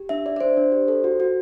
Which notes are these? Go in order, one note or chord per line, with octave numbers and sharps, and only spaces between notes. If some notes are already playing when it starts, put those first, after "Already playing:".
Already playing: G4
D4 E5
D4 D5
D5
D4 C5
D4
G4
A4
F#4
F#4